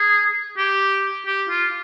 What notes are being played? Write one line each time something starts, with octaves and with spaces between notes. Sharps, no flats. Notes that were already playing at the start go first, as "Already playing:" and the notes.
Already playing: G#4
G4
G4
F4